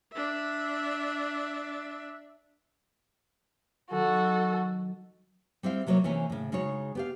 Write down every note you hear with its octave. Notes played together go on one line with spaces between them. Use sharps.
D4 E5
D#3 F#3 F#4 A4
G3 C4 E4 F5
C3 F#3 A#3 A4 C#5
C3 E3 A#3 C#4 C#5 G#5
A2 C#3
C#3 G#3 D#4 F#4 C#5
B3 G4 F5